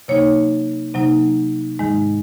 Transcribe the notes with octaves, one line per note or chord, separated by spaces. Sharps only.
C3 F#3 A#3 D#4 C#5
C3 F#3 A#3 D#4
G#2 D#3 G#3 D#4